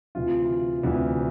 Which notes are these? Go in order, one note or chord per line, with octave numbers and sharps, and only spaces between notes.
D2 C3 E3 F4
D2 C3 E3